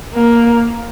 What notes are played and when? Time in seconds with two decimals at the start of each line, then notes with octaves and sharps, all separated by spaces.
0.14 A#3